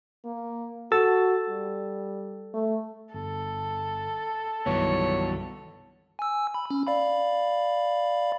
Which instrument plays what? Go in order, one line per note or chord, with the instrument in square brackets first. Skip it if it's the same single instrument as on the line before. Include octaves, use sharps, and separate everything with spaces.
[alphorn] A#3
[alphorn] F#4 [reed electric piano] A4 E6 A6
[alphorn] G3
A3
[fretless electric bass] G1 [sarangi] A4
[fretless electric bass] C2 G2 D#3 [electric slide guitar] E3 F#3 B3 [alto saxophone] C#5
[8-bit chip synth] G#5 E6
B5
C#4
D5 F5 B5